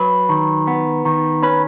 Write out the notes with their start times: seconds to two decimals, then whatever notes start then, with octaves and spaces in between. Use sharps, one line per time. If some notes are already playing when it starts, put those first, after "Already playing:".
Already playing: F#3 B4
0.29 D#3
0.67 B3
1.05 D#3
1.43 C#4 B4